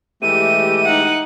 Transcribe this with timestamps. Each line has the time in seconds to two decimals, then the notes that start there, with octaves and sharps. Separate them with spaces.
0.22 E3 G#3 A3 G4 D#7
0.86 D#4 F#5